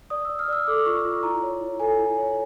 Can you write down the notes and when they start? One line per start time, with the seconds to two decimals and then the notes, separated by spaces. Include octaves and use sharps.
0.10 D5 D#6
0.25 E6
0.30 D5
0.39 F6
0.48 D5 E6
0.67 A4 D6
0.86 F4 C#6
1.05 F4
1.23 E4 A#5
1.42 C#5
1.61 E4
1.80 A4 G#5
1.99 E4
2.18 C#5